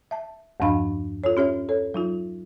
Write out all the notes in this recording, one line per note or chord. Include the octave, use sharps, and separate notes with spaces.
E5 A5
E2 G2 F3 D4 F5 B5
F4 A4 C#5
C#4 G4 C#5 E5
A4 C#5
F#3 D#4 F4